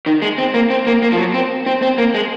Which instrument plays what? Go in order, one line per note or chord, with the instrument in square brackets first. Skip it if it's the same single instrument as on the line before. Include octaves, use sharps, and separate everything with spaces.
[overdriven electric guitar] D#3
G#3
C4
A#3
C4
A#3
A#3
F3
F#3
C4
C4
C4
A#3
G#3